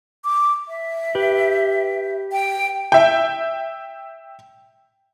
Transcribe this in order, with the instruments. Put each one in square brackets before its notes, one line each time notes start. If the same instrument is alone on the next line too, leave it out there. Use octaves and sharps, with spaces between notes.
[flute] D6
E5
[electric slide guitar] G4 B4
[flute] G5
[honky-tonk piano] E5 G5